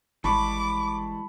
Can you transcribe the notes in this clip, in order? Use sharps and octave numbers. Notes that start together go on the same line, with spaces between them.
G#1 E3 G3 G#3 A5 B5 C#6 D6